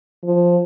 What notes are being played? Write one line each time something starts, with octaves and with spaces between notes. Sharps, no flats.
F3